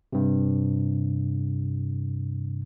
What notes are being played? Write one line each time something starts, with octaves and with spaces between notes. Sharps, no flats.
G2 C3